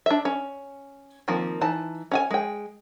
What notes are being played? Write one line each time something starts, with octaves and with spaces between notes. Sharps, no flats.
D4 E5
C#4
D#3 F3 A#3 C4
E3 D#4 A5
C#4 F#5 G#5
G#3 G5